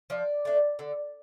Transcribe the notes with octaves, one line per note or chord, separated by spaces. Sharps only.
F3 D5
A3 D4
D3